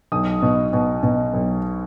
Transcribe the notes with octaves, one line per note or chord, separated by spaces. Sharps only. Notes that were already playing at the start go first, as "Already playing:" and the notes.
B1 D#6
B2
B2
B2
B1